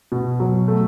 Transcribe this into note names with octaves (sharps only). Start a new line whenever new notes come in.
B2
F#3
A3